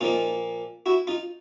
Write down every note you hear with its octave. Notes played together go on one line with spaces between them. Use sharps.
A#2 F3 A#3 D#4 F4
E4 F#4
D#4 F4